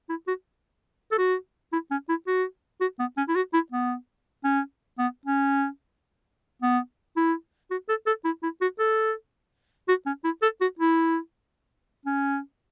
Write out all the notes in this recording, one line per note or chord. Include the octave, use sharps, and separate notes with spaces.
E4
F#4
A4
F#4
E4
C#4
E4
F#4
F#4
B3
C#4
E4
F#4
E4
B3
C#4
B3
C#4
B3
E4
F#4
A4
A4
E4
E4
F#4
A4
F#4
C#4
E4
A4
F#4
E4
C#4